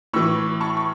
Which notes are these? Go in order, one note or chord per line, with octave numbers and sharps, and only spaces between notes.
A2 E3 C#6 E6
A5 C#6
C#6